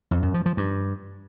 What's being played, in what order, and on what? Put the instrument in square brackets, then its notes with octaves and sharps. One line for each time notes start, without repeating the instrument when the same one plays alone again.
[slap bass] F2
F#2
F3
F3
G2